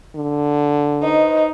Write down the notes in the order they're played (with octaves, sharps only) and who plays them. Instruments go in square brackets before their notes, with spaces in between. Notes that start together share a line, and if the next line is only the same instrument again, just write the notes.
[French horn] D3
[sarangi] D#4 [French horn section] B4 C5 D#5